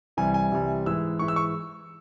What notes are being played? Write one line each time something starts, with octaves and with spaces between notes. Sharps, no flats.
C2 C3 E3 G3 G#5
G#5
C2 C3 E3 G3
G#2 E3 G#3 E6
G#2 E3 G#3 C#6
E6
C#6